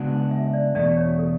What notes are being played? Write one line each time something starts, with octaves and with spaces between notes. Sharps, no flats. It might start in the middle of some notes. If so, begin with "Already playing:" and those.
Already playing: C#3 G#3 B3 D4 F#4
E5
E5
D5
E2 B2 A3 D5
C#5
A4